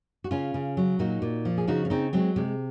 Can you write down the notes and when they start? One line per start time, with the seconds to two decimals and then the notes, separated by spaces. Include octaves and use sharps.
0.24 F#4
0.31 C#3 C#4 F4
0.54 C#3
0.77 F#3
0.99 A#2 D#4 F#4
1.22 A#2
1.45 F3
1.58 G#4
1.68 C#3 D#4 F#4
1.85 C#4
1.90 C#3 C4 D#4
2.13 F#3 G#3 C4
2.36 C3 G#3